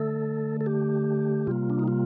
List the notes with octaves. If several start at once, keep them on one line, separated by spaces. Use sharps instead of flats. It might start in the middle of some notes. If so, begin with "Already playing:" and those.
Already playing: D3 A3 A4
A4
G4
C3 G3 A#3 F4
D4
D#4
F4